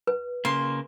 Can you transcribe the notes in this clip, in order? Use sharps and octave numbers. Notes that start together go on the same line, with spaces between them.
B4
C#3 A#3 C6